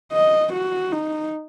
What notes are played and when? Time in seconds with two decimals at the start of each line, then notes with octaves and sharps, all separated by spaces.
0.13 D#5
0.54 F#4
0.92 D#4